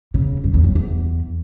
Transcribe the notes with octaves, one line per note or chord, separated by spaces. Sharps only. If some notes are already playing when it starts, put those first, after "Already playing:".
C#3
F#2
E2
F#2
E2